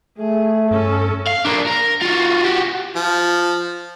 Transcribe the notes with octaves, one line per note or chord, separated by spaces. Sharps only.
A3 G#4
G2 C#4 A4
F5
A#3 D4
A#4
F4 F#4
F#4 G4
F3